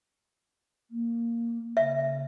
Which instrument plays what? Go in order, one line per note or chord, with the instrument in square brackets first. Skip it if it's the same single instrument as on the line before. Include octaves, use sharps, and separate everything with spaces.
[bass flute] A#3
[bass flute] C#3 [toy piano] E5